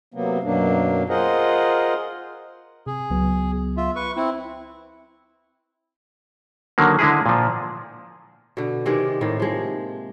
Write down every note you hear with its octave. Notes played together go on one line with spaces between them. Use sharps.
C3 F#3 A#3 B3
F#2 B2 F#3 A#3 D4
F4 G#4 A#4 C5 D#5 F#5
C3 G#4
C#2 F#3 B3
F4 E5
B4 C#6
C4 E4
D3 D#3 F#3 A#3
D3 G#3 E4 G#4
A#2 F3
B2 D3
C3 D#3 G#3 D5
A2 C3 D#3 A#3
F3 G#3